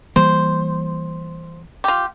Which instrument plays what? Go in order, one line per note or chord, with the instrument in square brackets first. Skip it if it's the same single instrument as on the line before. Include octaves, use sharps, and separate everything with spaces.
[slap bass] E3 G3 A#3 [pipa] C5
[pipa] F4 G4